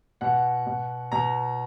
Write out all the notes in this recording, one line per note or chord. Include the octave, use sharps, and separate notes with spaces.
B2 F#5
B2
B2 A#5